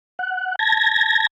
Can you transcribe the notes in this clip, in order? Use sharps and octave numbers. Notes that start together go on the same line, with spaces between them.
F#5
A5 G#6 A#6